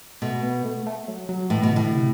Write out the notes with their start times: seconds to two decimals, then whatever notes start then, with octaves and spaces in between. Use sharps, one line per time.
0.22 B2 A3
0.42 B3
0.65 A3
0.86 A3
1.08 F#3
1.29 F#3
1.50 A2 E3
1.63 B2
1.72 A2 D3
1.94 C3